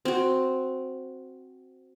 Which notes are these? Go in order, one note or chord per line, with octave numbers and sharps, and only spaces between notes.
C4 F#4